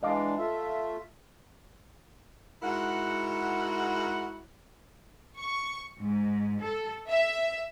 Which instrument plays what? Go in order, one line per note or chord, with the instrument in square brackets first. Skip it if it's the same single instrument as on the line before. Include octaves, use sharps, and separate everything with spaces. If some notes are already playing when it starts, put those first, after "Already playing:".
[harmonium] E3 G#3 D4 [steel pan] D#5 F5 D6
[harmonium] A3 F4 E5
[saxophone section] G#2 E4 F#4 A#4 F#5
[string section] C#6
G#2
A4
E5